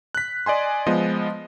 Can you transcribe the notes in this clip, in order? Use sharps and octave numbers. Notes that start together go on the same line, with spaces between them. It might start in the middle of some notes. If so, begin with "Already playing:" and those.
F#6 B6
D5 D#5 G#5 C6
F3 G#3 B3 D#5